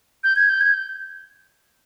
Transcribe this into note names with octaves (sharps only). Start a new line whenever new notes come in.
G6
G#6
G6
G#6
G6